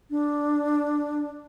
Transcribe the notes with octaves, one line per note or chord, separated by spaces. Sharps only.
D4